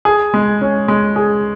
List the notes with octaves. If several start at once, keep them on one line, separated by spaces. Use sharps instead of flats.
G#4
G#3
C#4
G#3
G#4